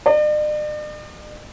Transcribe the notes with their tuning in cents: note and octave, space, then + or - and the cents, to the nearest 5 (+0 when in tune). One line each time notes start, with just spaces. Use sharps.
D5 +45